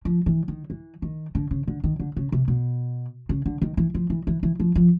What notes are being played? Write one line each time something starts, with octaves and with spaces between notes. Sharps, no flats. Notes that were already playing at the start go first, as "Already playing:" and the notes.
F3
E3
D#3
E3
D#3
D3
C#3
D3
D#3
D3
C#3
C3
B2
C#3
D3
D#3
E3
F3
E3
E3
E3
F3
F3